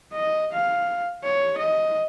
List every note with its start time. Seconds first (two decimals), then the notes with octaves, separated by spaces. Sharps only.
0.13 D#5
0.53 F5
1.24 C#5
1.58 D#5